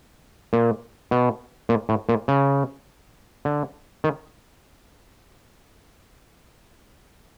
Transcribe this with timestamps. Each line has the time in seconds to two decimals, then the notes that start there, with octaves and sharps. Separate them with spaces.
0.53 A#2
1.11 B2
1.69 A#2
1.89 A2
2.09 A#2
2.28 C#3
3.45 D3
4.04 D#3